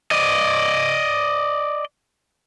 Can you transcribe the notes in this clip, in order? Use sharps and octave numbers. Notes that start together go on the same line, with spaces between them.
D5 D#5